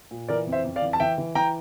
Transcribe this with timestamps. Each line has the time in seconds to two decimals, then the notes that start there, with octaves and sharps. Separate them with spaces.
0.11 A#2
0.28 E3 A#4 D5
0.47 F2
0.52 C5 E5
0.65 F2
0.76 D5 F5
0.82 E3
0.93 A5
1.00 E3 E5 G5
1.18 E3
1.35 E3 G5 A#5